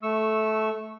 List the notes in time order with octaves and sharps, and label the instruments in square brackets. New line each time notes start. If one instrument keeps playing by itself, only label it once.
[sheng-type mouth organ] A3 C#6 E6